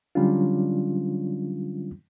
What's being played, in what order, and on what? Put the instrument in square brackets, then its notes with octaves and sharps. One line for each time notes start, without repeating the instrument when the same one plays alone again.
[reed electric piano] D3 F#3 G3 C#4 D4 F4